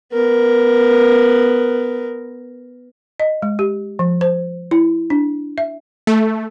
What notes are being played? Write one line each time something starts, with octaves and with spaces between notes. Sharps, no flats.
B3 A#4
D#5
G#3
G4
F3
C5
E4
D4
E5
A3